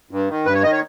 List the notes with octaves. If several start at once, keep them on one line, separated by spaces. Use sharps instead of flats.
G2
D#3
G2 B4
C#5
D#3 D#5
C#5